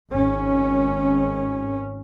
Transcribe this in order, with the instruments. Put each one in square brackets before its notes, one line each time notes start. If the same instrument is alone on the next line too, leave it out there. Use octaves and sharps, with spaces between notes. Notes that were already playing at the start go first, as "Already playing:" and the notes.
[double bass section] G#1 C#4